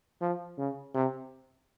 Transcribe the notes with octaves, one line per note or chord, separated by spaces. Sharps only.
F3
C#3
C3